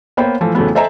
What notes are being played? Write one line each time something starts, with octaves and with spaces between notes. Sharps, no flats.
A#3 B3 C5 C#5 F5 G5
E3 F3 A3
F2 C#3 E3 F#3 A3 B3
A4 C5 D#5 E5 G#5 A#5